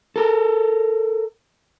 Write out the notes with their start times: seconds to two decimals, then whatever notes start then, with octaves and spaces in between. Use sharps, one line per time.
0.16 A4 A#4